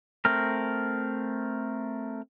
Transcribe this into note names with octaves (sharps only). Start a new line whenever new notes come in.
A3 C4 A#4